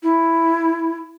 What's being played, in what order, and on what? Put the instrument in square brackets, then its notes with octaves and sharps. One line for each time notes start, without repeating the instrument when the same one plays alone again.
[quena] E4